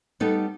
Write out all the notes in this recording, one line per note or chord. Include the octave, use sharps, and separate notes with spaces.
G3 B3 D#4 A4